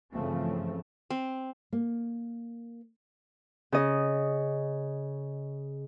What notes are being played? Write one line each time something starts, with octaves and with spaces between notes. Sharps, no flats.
G2 C#3 E3 F3 A3 C4
C4
A#3
C#3 D#5